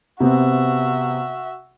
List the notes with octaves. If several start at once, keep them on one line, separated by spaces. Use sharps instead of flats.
C3 B3 C4 F#4 E5